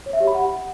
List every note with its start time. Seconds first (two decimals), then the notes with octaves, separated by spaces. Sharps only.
0.06 C#5
0.13 E5
0.20 G4
0.27 B5
0.35 F#5